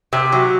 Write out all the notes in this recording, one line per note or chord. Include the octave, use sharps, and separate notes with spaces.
C3
F#3